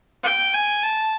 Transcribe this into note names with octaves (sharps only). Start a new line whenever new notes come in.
G5
G#5
A5